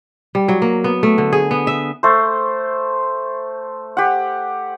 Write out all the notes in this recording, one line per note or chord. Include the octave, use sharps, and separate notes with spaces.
G3
F#3
A#3
B3
A3
D3
G#4
B3
E5
A3 C5
G4 F#5